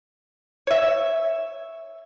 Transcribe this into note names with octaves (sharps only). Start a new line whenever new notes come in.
C#5 E5